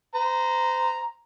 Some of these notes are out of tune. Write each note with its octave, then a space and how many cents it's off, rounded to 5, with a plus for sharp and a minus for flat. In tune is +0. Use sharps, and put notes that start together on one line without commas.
C5 -30 A#5 +0